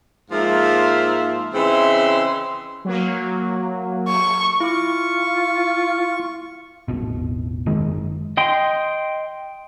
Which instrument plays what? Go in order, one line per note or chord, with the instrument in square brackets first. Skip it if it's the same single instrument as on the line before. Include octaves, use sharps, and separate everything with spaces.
[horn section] G#2 F3 A#3 E5 F5 C6
C#3 E3 C4 D#5 E5 C6
[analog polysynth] F#3 A#3
[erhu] C#6
[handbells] E4 D6 [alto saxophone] F4 [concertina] C#6
[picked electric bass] E1 A1 B2
F#1 D#3 G#3
[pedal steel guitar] D#5 G5 C6